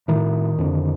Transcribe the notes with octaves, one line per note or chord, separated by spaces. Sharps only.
A2 D#3
F2 D3